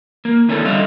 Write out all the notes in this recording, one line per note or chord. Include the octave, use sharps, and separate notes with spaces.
A#3
D#3 B3 C#4 D4 E4 A4
D3 G3 E4 D#5 F5